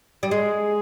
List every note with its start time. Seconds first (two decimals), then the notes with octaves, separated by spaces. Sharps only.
0.23 G3
0.30 G#3 G#4